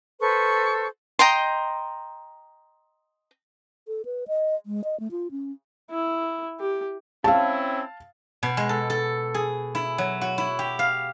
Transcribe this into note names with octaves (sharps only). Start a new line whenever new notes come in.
A4 B4 C5 C#6
D#5 G5 A#5 C6
A4
B4
D#5
G#3
D#5
A3
F4
C#4
E4
G4
C4 C#4 E4 F5 A5
B2
G#3
A4
A4
G#4
E4
F#3
F#4
E4
G4
F5